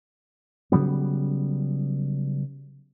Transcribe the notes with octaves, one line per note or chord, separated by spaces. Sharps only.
C#3 F#3 G3 B3